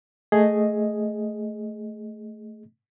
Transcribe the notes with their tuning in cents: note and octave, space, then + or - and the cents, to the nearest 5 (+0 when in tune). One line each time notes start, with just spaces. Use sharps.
A3 +0 G#4 +0 D#5 +0